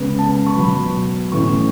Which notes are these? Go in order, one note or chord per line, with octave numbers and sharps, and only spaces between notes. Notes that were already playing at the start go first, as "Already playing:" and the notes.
Already playing: C#3 G#3 B3
A5
C#6
B2 F#3 B3 B5
A2 E3 A3 C#4 C#6